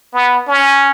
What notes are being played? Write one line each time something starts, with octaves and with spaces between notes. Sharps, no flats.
B3
C#4